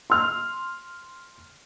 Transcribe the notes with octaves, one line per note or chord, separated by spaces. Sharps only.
C6 F6